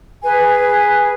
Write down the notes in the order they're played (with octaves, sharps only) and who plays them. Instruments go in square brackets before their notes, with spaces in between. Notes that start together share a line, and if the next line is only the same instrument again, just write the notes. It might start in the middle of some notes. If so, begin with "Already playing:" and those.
[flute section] G#4 B4 G#5